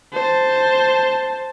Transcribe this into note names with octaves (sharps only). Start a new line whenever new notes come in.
C5 A5